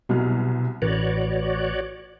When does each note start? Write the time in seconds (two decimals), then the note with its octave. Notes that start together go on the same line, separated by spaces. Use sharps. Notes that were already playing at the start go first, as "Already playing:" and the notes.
0.09 C2 B2 F#3 F6
0.82 A1 F#4 B4 C#5 D5